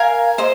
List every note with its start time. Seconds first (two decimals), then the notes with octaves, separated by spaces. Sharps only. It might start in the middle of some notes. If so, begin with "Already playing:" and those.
Already playing: A#4 F5 G#5
0.38 C5 D#5